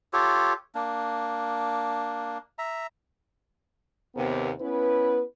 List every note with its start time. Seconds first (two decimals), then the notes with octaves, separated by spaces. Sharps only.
0.13 F4 G4 A4 C#5
0.75 A#3 D4
2.58 E5 A#5
4.15 D#2 C3 B3
4.60 B3 C#4 E4 B4